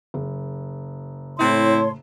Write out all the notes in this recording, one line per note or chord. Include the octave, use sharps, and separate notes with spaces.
F#1
A2 C4 E4 C#5 A5 C6